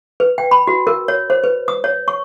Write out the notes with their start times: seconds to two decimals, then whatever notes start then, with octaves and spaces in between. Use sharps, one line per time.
0.20 B4
0.38 G5
0.51 B5
0.67 F#4
0.87 A#4
1.08 C#5
1.30 C5
1.44 B4
1.68 D#6
1.84 C#5
2.08 C#6